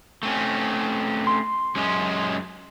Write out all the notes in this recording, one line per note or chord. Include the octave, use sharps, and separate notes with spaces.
A3 C4 C#4
C6
F#2 G#3 C#4